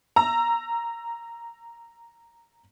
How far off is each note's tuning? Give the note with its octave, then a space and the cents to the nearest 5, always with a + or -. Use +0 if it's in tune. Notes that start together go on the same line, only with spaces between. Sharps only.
A#5 +0 E6 +25